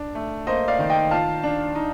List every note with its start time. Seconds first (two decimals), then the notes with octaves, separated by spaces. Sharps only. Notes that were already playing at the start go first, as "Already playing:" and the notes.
Already playing: D4
0.15 A3
0.47 A#3 C5 D#5
0.68 D5 F5
0.79 D#3
0.90 D#5 G5
1.11 F4 F5 A5
1.43 D4
1.75 D#4